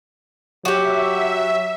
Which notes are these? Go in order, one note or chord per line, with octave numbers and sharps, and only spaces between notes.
F#3 F#4 G4 E5